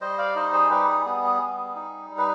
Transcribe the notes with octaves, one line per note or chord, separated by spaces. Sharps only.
G3 C5 D#5
D5 F5
D#4 C5 D#5
G#4 C5
G3 G4 B4
G#4
B3 G#4
G#4
G3
D#4
G3
B4